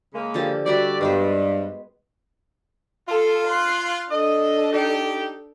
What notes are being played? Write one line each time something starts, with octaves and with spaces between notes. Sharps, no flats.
C#3 G#3 A#3
D3 F3 G4
G3 F#4 D5 E5
G2 G#3 B3 C5
F4 A4
C6 F#6
D4 A4 D#5
D#4 G4